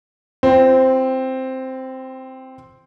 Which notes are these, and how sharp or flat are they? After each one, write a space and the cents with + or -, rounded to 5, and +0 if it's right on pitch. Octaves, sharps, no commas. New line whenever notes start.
C4 +0 F4 -35